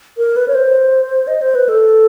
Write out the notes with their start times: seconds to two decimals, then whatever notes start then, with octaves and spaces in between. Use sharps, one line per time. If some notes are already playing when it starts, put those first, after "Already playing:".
0.18 A#4
0.36 B4
0.48 C#5
0.54 C5
1.27 D#5
1.42 C5
1.55 B4
1.69 A4